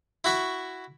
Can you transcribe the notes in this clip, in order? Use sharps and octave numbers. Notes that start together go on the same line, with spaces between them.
E4 F#4 E5 C#6